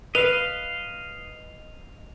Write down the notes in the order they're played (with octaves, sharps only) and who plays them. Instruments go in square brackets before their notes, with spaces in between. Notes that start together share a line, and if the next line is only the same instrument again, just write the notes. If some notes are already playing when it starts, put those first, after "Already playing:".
[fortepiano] B4 [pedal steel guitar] D#5 F5 [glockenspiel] F7